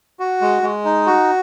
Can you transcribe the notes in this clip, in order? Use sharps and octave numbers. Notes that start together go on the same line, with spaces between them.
F#4
G#3
G#3
D#4
F#4